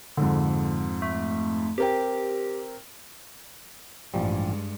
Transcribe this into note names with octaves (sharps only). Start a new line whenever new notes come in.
F2 G#2 D3
A3
C4 G4 A#4 G5
A1 G2 F3 G3 G#3